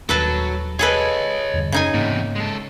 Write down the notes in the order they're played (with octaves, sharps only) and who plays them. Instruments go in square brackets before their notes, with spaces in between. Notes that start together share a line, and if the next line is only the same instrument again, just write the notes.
[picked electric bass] D#1 D#2 D4 [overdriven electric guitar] F#3 [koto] A4 B4 A5
[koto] G#4 A4 B4 [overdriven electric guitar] C#5 D#5
[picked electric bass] E2 G2 D3
[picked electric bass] F#2 [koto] C#3 D#4 G#5
[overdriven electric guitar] E2 C3 [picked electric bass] G#2 A#3
[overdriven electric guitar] G#3 A4